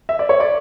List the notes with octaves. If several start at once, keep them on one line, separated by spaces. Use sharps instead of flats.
E5
D5
C#5
D5